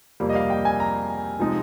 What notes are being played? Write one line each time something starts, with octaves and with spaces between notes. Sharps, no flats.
F2 C3 G3 A#3
D#5
F5
G5
G#5
A#5
C3 F3 G#3 D#4